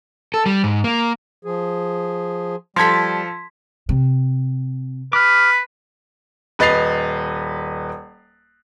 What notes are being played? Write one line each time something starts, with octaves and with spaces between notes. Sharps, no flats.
A4
G3
G#2
A#3
F3 G#4
F3 G3 A4 C6 G#6 B6
C3
B4 D6 F6
D#1 B4 D#5 A6 C7 F7